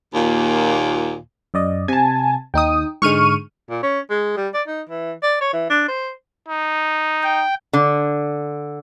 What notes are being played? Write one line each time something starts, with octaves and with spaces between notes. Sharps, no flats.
D#2 A#2
F#2 D5 D#5
C3 G#5 A5
D#2 D#4 G5 D#6
G#2 D3 G#3 C#6 F6 D#7
A#2
C#4
G#3
G3
D5
D#4
E3
D5
C#5
E3
D4
C5
D#4
G5
D3